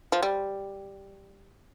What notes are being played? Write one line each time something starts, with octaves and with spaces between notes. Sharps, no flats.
F3
G3